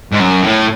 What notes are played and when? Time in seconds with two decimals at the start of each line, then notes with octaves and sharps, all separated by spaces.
0.12 G#2
0.19 F#2
0.42 A2